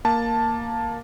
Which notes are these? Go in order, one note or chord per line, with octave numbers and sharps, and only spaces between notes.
A#3 A5